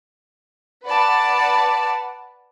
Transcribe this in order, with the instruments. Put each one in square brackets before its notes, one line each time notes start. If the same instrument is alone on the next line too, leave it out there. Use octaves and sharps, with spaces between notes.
[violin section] B4 D5 F#5 A5